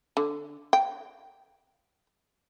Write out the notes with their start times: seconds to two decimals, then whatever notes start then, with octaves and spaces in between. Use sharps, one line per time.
0.17 D3
0.73 G5